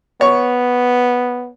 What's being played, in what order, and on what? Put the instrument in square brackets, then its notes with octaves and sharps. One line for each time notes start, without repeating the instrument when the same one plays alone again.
[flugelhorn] B3 [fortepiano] C#5